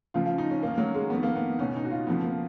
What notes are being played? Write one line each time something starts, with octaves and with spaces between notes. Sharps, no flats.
C#2 C#3 F3 F4
F4
D#4
C#4
F#2 D#3 A#3
F#3
G#3
F2 D#3 B3
A#3
B3
C#2 B2 C#4
D#4
F#4
F4
F2 C#3 F3 B3
A#3